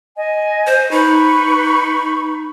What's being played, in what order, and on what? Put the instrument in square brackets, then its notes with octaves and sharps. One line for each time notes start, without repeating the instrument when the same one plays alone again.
[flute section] D#5 G#5
[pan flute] C5
[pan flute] D#4 [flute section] B4 B5 C#6